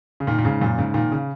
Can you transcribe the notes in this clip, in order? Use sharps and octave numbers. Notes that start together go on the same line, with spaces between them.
C#3
A#2 D#3
A#2
G#2 C#3
F#2 A#2
G#2 C#3
A#2 D#3
C#3